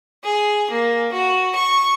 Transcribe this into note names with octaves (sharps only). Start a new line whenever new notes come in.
G#4
A#3
F#4
C#6